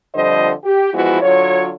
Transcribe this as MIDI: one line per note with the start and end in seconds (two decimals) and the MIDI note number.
0.15 0.51 41
0.15 0.51 50
0.15 0.51 53
0.15 0.51 55
0.15 0.51 72
0.15 0.51 75
0.64 0.91 67
0.94 1.22 52
0.94 1.22 53
0.94 1.22 56
0.94 1.22 59
0.94 1.22 64
0.94 1.22 66
1.22 1.71 50
1.22 1.71 54
1.22 1.71 65
1.22 1.71 73